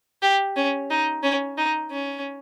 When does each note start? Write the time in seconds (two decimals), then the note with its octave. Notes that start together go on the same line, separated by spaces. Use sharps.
0.22 G4
0.56 C#4
0.90 D#4
1.23 C#4
1.57 D#4
1.91 C#4